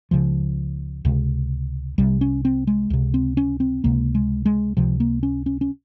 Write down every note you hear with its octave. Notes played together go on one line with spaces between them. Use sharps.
C#2 C#3 F3
C#2 C3
C2 C3 G3
C#4
C4
G#3
C#2 C3
C4
C#4
C4
C#2 C3 A#3
G#3
G#3
C#2 C3 F3
A#3
C#4
C#4
C#4